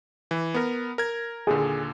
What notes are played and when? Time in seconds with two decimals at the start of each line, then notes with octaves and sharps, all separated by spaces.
0.31 E3
0.54 B3 A#4
0.98 A#4 G#6
1.47 D#2 A#2 D3 G#4